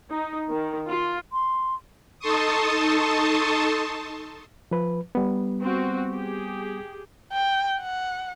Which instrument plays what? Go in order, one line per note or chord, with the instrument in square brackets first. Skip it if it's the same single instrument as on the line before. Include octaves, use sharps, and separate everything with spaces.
[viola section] D#4
D#3
F4
[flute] C6
[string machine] D#4 A4 A5 C6 C#6 D#6
[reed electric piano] F3 B4
G3 B3
[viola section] C4 F#4
G4 G#4
[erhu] G5
F#5